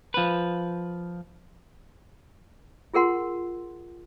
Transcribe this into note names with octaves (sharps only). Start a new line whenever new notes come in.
F3 B4
F4 G#4 A#4 F#5 C6